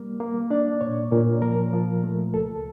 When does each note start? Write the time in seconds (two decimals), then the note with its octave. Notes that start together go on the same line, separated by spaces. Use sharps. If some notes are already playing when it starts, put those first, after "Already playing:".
Already playing: G3 A#3
0.20 A#3
0.50 D4 D5
0.81 A#2 C#5
1.11 A#2 A#4
1.42 F3 A#4
1.73 F3
2.03 A3
2.34 C#2 A4